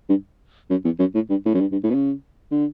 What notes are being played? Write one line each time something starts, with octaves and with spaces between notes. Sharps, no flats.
G2
F#2
E2
F#2
A2
G2
A2
F#2
G2
G2
A2
B2
C#3
D3